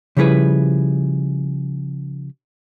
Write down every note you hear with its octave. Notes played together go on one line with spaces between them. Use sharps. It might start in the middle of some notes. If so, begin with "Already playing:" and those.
C#3 F3 G3 E4 G#4 B4